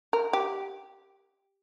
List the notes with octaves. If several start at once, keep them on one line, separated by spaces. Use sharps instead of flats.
A#4
G4